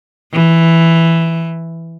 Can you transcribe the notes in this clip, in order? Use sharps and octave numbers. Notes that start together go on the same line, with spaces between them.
E3